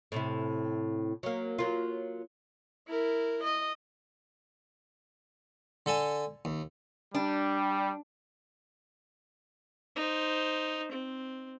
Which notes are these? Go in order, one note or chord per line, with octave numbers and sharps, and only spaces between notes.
A2 C3 E4
F#3 A#3
F#3 A#3 F4
E4 A#4
D#5
D3 A4 G#5 A5
D#2
G3 D4
D#4 C5
C4